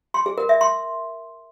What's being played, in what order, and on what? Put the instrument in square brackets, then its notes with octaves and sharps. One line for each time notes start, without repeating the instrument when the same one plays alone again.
[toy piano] C6
G#4
A#4
E5
C6